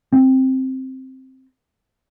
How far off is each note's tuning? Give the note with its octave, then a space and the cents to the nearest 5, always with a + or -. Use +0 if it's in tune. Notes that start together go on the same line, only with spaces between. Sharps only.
C4 +5